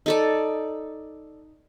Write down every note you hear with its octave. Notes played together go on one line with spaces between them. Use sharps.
D#4 A4 D5